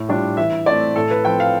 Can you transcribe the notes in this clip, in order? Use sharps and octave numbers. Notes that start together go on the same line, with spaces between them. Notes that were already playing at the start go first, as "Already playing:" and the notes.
Already playing: A2
G3 D4 F4
E3 E5
A3 C4 D5
A2 A4
B4
F3 C4 G5
F5